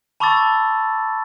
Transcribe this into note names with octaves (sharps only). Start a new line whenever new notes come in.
A5 B5 C#6 D6 E6 A6